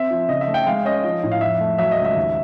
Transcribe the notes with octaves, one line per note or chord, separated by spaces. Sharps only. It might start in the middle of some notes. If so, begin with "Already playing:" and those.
Already playing: C4 E5
F3
C#3 D#5
E5
A3
G5
G#3 F5
C#4 D#5
F3 D#5
A2
F5
F2 E5
A3
F#3 E5
D#5
C#2
E5
D#2